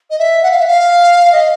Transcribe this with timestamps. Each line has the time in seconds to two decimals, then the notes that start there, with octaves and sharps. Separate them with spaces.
0.10 D#5
0.19 E5
0.43 F#5
0.51 F5
0.59 E5
0.66 F5
1.32 D#5